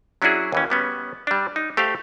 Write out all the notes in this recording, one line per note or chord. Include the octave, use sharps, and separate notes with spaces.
F#3 C#4 D4 E4 F#4 G#4
D#2 E3 C#4
G3 B3 C#4
G3 D4
D#4
A3 G4 C5 F5